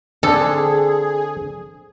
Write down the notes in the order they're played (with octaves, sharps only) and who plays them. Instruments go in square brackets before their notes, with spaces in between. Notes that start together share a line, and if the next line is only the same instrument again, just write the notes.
[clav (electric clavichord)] D3 C4 [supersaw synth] G#4 [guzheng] A4